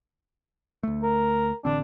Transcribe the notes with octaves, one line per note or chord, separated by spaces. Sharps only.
D2 A3
A#4
A1 D3 C4 D4